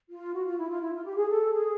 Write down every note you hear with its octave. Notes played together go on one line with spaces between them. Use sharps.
F4
F#4
F4
E4
F4
E4
F4
G4
G#4
A4
G#4